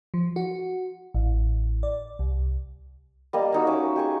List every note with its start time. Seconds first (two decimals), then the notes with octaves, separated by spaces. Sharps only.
0.14 F3
0.36 F#4
1.14 A1
1.83 D5
2.19 C2
3.33 G3 A#3 D#5
3.52 A#3 D#4 F#4
3.67 C#4 D#4 E5 D6
3.96 G4 G#4 C#6